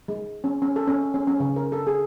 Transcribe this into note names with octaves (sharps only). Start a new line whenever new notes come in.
G#3
C#4
C#4
A4
C#4
C#4
C#4
C#3
A#4
A4
G#4